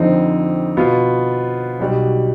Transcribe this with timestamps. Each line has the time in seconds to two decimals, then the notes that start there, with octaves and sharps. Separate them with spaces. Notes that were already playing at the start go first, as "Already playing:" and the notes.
Already playing: F2 D3 F3 C4 D#4
0.77 B2 B3 F4
1.79 B1 B2 G3